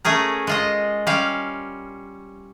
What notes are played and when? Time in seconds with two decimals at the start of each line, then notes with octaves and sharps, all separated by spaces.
0.05 A3 C#4 G#4 A#4
0.47 G#3 F4 D#5
1.07 G3 C#4 F5